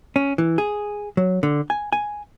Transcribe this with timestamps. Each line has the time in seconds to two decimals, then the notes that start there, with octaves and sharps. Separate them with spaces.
0.16 C#4
0.38 E3
0.58 G#4
1.17 F#3
1.43 D3
1.70 G#5
1.93 G#5